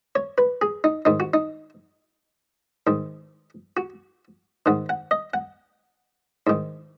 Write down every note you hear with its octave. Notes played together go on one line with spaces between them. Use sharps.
C#5
B4
G#4
D#4
G#2 D#3 D#4
F#4
D#4
G#2 D#3
F#4
G#2 D#3 F#5
F#5
D#5
F#5
G#2 D#3